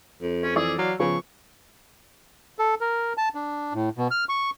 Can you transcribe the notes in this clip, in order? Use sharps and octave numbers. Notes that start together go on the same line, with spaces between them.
F2
C#4 C5
E3 G#4 D5 E6
F#3 F5
C#3 F3 B3 C#6
A4
A#4
A5
D4
A2
B2
F6
C#6